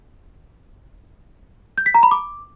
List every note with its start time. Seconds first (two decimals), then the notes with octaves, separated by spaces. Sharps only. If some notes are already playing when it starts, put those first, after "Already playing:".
1.78 G6
1.86 B6
1.94 A#5
2.03 B5
2.11 D6